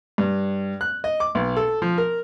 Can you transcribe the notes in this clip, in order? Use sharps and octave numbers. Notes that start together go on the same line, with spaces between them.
G2
F#6
D#5
D6
B1
A4
F3
A#4